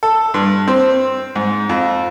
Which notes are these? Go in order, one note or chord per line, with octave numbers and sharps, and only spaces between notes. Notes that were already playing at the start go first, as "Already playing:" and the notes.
A4
G2
C4
G#2
F2